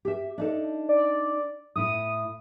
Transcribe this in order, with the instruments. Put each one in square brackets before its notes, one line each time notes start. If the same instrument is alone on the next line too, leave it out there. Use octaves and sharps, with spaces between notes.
[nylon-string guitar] G4 E5
D4 D#4 A4
[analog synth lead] D5
[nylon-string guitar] A2 E4 [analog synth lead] D#6